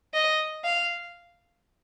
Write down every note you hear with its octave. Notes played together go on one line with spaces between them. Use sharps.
D#5
F5